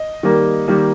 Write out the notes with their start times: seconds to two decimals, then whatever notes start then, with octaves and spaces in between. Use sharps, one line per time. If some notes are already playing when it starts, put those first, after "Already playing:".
Already playing: D#5
0.23 D#3 G3 A#3
0.68 D#3 G3 A#3